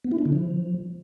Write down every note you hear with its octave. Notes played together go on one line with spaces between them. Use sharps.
B3
E4
D4
D3
F3